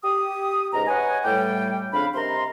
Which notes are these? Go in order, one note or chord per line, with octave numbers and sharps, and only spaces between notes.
G4 D#6
C#2 G#2 D#5 A#5
B4 C#5 D#5 F#5 G#5
A2 G3 G5
F2 C#3 D4 F5 B5
C3 A#4 D#5 A#5 C6